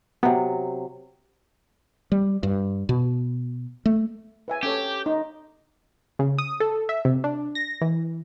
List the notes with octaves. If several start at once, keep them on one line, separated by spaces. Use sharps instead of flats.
C3 F#3 B3
G3
G2
B2
A3
B4 E5 G#5
C#4 G4 A4 C#5
D#4
C#3
D#6
A4
E5
C3
D4
A#6
E3